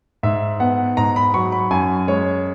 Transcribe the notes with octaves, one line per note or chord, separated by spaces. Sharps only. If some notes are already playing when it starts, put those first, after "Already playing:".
G#2 E5
B3 F#5
G#2 A#5
B5
F#3 C#6
B5
F#2 G#5
G#3 C#5